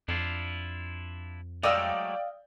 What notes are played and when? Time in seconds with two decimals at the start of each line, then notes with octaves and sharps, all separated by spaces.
0.08 F2 D4 E4 F4
1.63 F#3 G#3 A3 D5 D#5 F5 G5 E6